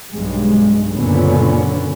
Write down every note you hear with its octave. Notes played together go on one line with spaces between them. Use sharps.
B1 G2 G#3
F#1 A#2 D3 B3 C#4